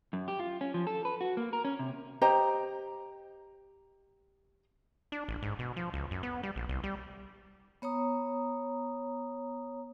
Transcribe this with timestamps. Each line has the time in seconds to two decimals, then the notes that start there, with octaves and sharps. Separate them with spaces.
0.13 F#2
0.28 G4
0.39 F4
0.61 C#4
0.74 F3
0.87 A4
1.05 B4
1.21 F#4
1.37 A#3
1.53 A#4
1.65 C#4
1.79 C3
2.22 G4 C5 D#5 A#5
5.12 D4
5.28 A1
5.43 G#2
5.59 B2
5.76 F3
5.94 C#2
6.11 F#2
6.23 B3
6.43 G3
6.56 A#1
6.69 C2
6.84 G3
7.82 B3 C#5 A#5 D#6